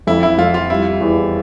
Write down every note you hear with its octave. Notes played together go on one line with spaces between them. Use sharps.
F2 E4
E4
F2 F4
F4
G3 E4
E2